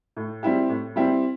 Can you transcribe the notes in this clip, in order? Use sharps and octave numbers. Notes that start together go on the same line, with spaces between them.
A2
G3 C4 E4 G4
A2
G3 C4 E4 G4